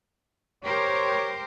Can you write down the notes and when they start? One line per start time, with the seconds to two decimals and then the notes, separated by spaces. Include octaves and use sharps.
0.64 G4 A#4 C5 C#5